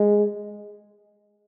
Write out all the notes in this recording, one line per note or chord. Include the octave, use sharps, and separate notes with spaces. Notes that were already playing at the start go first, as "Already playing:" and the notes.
Already playing: G#3